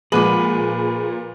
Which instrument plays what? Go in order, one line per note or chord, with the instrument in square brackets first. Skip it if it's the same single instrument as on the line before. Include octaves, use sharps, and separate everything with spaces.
[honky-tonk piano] A#2 F#7 [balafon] F3 G#3 D6 [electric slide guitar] G#4 [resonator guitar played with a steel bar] B4